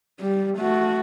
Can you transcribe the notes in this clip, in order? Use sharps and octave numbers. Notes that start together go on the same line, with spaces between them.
G3
A3 F#4